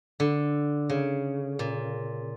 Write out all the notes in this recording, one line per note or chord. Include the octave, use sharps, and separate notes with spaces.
D3
C#3
A#2